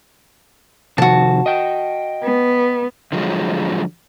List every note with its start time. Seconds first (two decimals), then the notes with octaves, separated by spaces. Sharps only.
0.98 C3 D#3 F3 F#4 A5
1.46 D#5 G5
2.23 B3
3.12 D3 F3 F#3 G#3